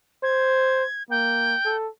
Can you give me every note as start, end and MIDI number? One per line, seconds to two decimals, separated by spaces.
0.23 0.84 72
0.23 1.03 92
1.10 1.55 58
1.10 1.76 79
1.65 1.88 69